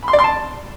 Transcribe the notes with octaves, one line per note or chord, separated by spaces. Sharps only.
B5
C6
D5
C6
A5